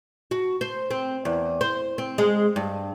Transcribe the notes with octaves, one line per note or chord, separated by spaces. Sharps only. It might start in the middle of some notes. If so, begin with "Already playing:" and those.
F#4
C5
C4
E2
C5
C4
G#3
G2